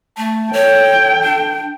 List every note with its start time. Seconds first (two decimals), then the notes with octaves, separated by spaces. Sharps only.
0.17 A3 A5
0.53 A4 C#5 G5
1.24 D4